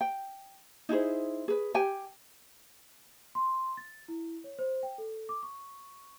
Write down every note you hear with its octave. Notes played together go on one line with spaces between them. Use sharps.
G5
D#4 E4 G#4 C5
G#4 B4
G4 G5 G#5
C6
A6
E4
C#5
C5
G5
A4
D6
C#6